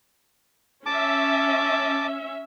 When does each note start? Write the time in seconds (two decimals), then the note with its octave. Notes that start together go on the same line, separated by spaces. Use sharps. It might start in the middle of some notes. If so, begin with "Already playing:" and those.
0.86 C#4 E5 A5 D6